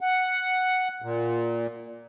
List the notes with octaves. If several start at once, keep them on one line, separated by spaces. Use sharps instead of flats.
F#5
A#2